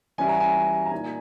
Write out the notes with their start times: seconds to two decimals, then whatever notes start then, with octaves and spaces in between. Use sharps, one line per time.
0.18 E3 G3 C#4 E4 G#5
0.29 A#5
0.40 G#5
0.86 A#5
0.92 A#2 A#3 D#4 G#5